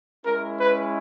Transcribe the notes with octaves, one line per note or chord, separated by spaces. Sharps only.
G#3 C#4 E4 A#4
B4